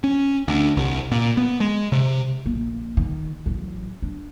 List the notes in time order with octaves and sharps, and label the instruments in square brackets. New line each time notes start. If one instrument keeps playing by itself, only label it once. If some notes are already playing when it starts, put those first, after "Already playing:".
[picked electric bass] C#4
D2
C2
A#2
B3
G#3
C3
[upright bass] A#1
D#3
A1 F#3
D4